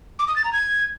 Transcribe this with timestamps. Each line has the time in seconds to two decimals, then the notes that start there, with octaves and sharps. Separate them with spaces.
0.19 D6
0.28 D#6
0.36 A6
0.44 A#5
0.53 G#6